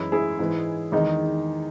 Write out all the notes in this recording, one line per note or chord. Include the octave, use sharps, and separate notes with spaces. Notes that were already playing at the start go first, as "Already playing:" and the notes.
Already playing: F#2 E3 G#3 E4
E4 G#4
G#2 E3 G#3
E2 D#3 G#3 D#4